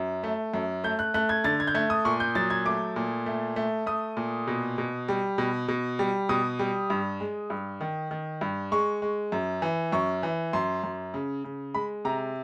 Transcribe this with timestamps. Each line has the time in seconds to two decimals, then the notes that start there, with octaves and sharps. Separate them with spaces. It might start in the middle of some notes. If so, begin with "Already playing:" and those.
Already playing: F#2
0.24 A3
0.54 F#2
0.84 A3 G6
0.99 F#6
1.14 A3 F#6
1.29 G#6
1.44 D3 A6
1.60 G#6
1.67 G6
1.75 A3 G#6
1.90 D#6
2.05 A#2 C#6
2.20 G6
2.35 F#3 A6
2.50 G#6
2.66 A3 D6
2.96 A#2
3.26 A3
3.56 A3
3.86 A3 D#6
4.17 A#2
4.47 B2
4.78 B2
5.08 G3
5.38 B2
5.68 B2
5.99 G3
6.29 B2 D#6
6.59 G3
6.90 G2
7.20 G#3
7.50 G2
7.81 D#3
8.11 D#3
8.41 G2
8.72 G#3 C#6
9.02 G#3
9.32 F#2
9.62 E3
9.92 F#2 C#6
10.23 E3
10.53 F#2 C6
10.84 F#2
11.14 C#3
11.44 C#3
11.74 G#3 B5
12.05 C3 A#5